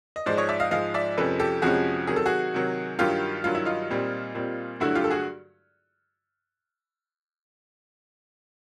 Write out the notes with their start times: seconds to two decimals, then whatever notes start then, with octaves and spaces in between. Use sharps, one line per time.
0.16 D#5
0.26 G#2 F3 G#3 C5 D5
0.37 C#5 D#5
0.49 D5 E5
0.60 D#5 F5
0.71 G#2 F3 G#3 D#5 F5
0.94 D5 E5
1.17 F2 C3 F3 G#3 C#4 A4 B4
1.40 G4 A4
1.62 F2 C3 F3 G#3 C#4 F#4 G#4
2.07 C3 D#3 F#3 G#4
2.16 A4
2.26 F#4 G#4
2.54 C3 D#3 F#3
2.99 G2 D#3 F#3 F4 G4
3.44 G2 D#3 F#3 F4
3.55 E4
3.65 D#4 F4
3.90 A#2 G3 C4
4.35 A#2 G3 C4
4.80 G2 D3 F#3 A3 E4 F#4
4.95 F4 G4
5.04 A4
5.10 F#4 G#4